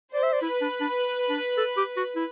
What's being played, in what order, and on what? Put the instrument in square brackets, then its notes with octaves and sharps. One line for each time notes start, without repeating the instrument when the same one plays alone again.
[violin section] C5 [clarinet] D5
[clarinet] E5
D5
[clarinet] E4 [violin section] B4
[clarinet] D4
D4
D4
A4
G4
F#4
E4